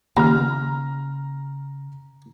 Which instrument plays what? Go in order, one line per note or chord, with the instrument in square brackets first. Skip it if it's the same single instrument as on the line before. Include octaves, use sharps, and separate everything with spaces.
[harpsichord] D#2 [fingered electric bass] C#3 [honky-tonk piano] A#5 F6